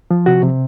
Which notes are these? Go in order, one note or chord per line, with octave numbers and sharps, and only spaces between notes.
F3
C3 F#4
C3